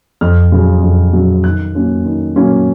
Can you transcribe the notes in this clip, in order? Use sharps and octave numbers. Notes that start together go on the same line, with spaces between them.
F2 F6
C#3 F#3
F2
C#3 F#3
D#3 F#6
F#3 A#3 C#4
D#3
F#3 A#3 C#4